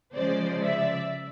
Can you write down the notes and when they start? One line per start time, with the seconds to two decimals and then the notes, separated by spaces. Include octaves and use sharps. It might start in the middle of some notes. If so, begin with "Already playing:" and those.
0.15 C#3 F3 G#3 C5 D5
0.63 D5 E5